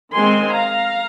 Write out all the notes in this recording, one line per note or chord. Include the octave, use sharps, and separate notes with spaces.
D#3 G#3 C4 G#5 C6
F5 A#5